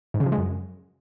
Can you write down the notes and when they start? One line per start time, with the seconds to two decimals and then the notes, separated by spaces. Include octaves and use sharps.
0.14 G#2
0.20 C#3
0.26 F3
0.32 G#3
0.38 F#2